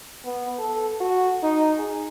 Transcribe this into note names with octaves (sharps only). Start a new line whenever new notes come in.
B3
A4
F#4
D#4
G#4